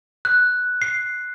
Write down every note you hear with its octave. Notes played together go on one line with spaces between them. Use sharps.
F#6
C7